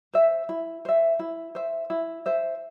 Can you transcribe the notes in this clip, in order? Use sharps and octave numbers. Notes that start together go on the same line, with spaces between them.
C5 E5
E4
C5 E5
E4
C5 E5
E4
C5 E5